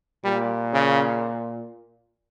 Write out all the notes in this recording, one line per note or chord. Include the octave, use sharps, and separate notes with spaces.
A#2 G3
C#3